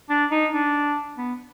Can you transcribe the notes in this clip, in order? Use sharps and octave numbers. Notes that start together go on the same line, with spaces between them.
D4
D#4
D4
B3